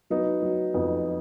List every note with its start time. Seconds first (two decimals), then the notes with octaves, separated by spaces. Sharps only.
0.10 F#3 B3 D#4
0.43 F#3
0.74 F2 B3 D#4